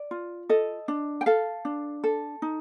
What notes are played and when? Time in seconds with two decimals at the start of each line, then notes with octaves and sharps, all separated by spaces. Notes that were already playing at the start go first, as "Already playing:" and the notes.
Already playing: D5
0.11 F4
0.49 A4 D#5
0.88 D4
1.21 G5
1.26 A4 F5
1.65 D4
2.04 A4
2.42 D#4